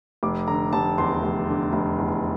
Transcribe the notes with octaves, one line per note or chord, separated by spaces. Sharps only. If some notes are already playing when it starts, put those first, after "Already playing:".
F1 D6
D3 A#5
F1 A5
E2 C6
F1
D3
F1
E2